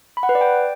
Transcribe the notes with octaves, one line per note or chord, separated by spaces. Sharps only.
B5
F#5
B4
D5
G5